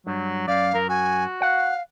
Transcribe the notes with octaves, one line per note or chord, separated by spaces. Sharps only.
G2 F#3
F#2 D5 F5
F#2 A#4
F#4 G#5
F5 F#5